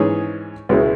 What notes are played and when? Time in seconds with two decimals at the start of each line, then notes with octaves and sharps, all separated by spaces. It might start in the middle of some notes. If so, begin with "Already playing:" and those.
Already playing: G#2 E3 C#4 G#4 C#5
0.69 C#2 B2 G#3 C#4 E4